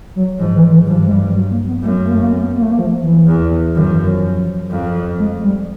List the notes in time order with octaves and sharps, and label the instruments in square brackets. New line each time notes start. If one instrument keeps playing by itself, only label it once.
[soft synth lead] F#3
[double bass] G#2 [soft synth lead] F3
[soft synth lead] E3
E3
[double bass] G2 [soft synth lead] F3
[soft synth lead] G#3
G3
F#3
A#3
B3
[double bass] F#2 [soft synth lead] A3
[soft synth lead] A#3
A3
A#3
B3
A#3
A3
A#3
F3
E3
[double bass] E2
[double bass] F#2 [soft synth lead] D#3
[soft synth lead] E3
F3
[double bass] F2
[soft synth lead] G#3
G3